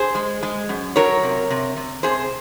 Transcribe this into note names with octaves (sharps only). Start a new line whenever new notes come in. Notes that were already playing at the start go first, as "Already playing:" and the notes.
Already playing: G#4 C5
G#3
G#3
F#2
F#3 A#4 C#5
C3
C3
C3
C3 G#4 C5